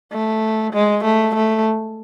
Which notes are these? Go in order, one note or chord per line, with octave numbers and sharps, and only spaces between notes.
A3
G#3
A3
A3